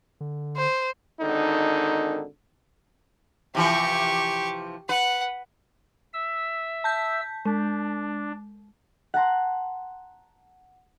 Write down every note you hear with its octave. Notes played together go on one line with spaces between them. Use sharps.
D3
C5
G#1 D3 D#3 D#4
C3 E3 F3 G4 C#6
B4 F#5
E5 E6
A5 G6 B6
G#3 D4
F#5 A5 A#5 C6